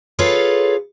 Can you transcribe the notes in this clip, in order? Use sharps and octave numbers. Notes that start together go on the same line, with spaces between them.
F4 G#4 A4 B4 C#5 F5